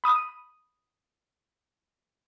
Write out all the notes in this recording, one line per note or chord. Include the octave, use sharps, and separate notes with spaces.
B5 D#6 D#7